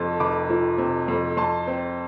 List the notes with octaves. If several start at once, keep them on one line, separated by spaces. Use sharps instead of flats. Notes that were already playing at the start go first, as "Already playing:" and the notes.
Already playing: F1 F2 C3 A5 C6
F1 B5 D6
F3
C3
F2
F2 A5 C6
C4